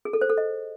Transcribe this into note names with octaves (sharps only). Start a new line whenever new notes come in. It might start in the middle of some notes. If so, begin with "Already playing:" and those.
G#4
A4
C5
A4
D#5